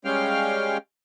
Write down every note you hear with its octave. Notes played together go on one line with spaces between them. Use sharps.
G3 G#3 C#4 F5 G5 F6